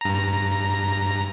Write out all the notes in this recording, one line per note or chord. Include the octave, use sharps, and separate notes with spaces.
G2 A#5